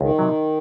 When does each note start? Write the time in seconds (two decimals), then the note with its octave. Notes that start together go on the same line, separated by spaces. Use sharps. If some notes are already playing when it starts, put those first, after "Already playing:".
0.01 C#2 D#3
0.19 C3 F#3